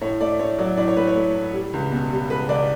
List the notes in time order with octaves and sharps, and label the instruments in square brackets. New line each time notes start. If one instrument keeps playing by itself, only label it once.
[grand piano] A2 C#5
A3 D5
A2 C#5
F#3 D5
A2 D5
C#5
A2 B4
C#5
A3
A2
G3
C#2
B2
G3
C#2 B4
C#2 D5